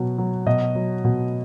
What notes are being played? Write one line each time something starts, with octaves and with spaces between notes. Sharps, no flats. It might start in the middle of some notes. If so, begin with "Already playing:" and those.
Already playing: B2 F#3
F#3
B2 D#5
F#3
B2